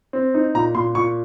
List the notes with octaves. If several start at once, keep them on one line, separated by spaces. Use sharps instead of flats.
C4
D#4
A#2 A#5
A#2 C6
A#2 C#6